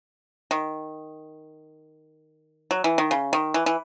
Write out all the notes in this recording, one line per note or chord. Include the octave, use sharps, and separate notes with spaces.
D#3
F#3
E3
D#3
C#3
D#3
E3
E3